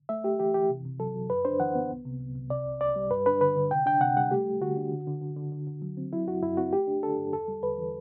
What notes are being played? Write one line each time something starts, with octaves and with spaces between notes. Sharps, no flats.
A3 E5
A3 G4
E3 G4
E3 G4
C3
C3
F#3 A4
F#3
F#2 B4
D4 C5
E3 F#5
B3
C2
C3
C2
C2
C3 D5
C2
C2 D5
G3
G2 B4
D4 B4
D3 B4
D3
C3 G5
D4 G5
C3 F#5
G3 F#5
A3 G4
A3
D3 F#4
D4
D3
D3
D3
D3
D3
D3
F#3
C4
F#3 E4
F#2 F#4
F#2 E4
C4 F#4
A3 G4
D4
D4 A4
G2
E2 A4
G3
E2 B4
E3